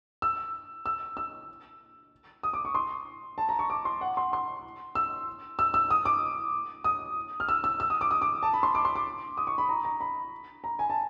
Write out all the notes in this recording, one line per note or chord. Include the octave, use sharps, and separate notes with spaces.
E6
E6
E6
D#6
D6
C#6
C6
A5
A#5
C#6
D6
C6
F#5
C6
C6
E6
E6
E6
D#6
D6
D#6
F6
E6
E6
E6
D#6
D6
D#6
D6
A5
B5
C6
D6
C6
D6
D#6
C#6
B5
A#5
A#5
B5
A#5
G#5
A5